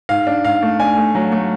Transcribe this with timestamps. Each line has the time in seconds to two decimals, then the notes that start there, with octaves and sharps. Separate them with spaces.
0.09 G#2 F5
0.27 D4
0.45 G#2 F5
0.63 A3
0.80 D4 G#5
0.98 A3
1.15 F#3
1.32 A3